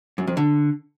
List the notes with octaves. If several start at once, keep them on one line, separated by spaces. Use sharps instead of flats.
F#2
F2
D3